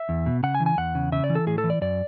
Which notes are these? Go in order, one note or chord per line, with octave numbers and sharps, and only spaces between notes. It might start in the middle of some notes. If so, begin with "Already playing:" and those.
Already playing: E5
E2
B2
C#3 F#5
G#5
E3
G#5
E2 F#5
C#3
C#3 E5
D5
E3
A4
A2 G#4
A4
E3
D5
F#2 D5